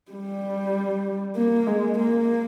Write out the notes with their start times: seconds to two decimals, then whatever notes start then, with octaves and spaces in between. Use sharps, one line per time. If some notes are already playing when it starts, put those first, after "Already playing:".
0.12 G3
1.36 A#3
1.67 G#3
1.98 A#3